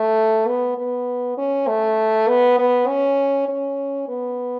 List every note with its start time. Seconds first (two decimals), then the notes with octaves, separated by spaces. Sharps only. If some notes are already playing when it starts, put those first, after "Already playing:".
Already playing: A3
0.47 B3
0.78 B3
1.38 C#4
1.67 A3
2.28 B3
2.58 B3
2.88 C#4
3.49 C#4
4.09 B3